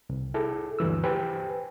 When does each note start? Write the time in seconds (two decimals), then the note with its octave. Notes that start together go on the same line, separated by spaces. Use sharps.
0.09 C2
0.34 E4 G#4 A4
0.79 D2 G2 E3 E6
1.04 G4 B4 C5 G5 G#5